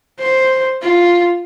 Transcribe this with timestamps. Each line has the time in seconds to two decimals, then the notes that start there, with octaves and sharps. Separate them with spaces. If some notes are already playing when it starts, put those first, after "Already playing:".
0.19 C5
0.82 F4